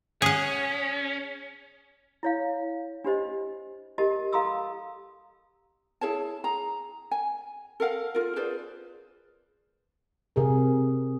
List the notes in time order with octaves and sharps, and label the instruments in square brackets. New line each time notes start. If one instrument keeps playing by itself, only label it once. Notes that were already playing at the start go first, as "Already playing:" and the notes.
[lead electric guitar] C#4 [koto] G#4 F#5
[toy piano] E4 C#5 F5
D4 G4 C5 D#5
G4 A#4 D#5 A5
A4 F5 A#5 C6 D#6 E6
[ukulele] E4 G#4 C#5 A5
G#4 A#5
G#5
A4 A#4 F5 F#5
F4 A#4
G#4 B4 C5 D5
[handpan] C3 G#4 A#4